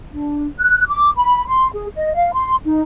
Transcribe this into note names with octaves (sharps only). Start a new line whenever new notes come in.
D4
F#6
D6
B5
C6
G#4
D#5
F5
C6
D#4